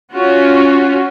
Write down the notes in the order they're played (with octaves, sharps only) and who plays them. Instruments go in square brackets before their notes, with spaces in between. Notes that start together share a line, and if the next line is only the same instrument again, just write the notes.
[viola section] C#4 F4 F#4